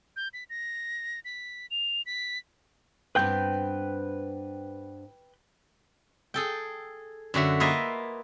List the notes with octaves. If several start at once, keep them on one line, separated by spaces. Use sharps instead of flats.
G6
B6
A#6
B6
F7
B6
G2 B3 C4 B4 G5 G6
G#4 A4 G5
F#2 D3 F#4 E5
A#3 F4 B4 D#5 E5 G#5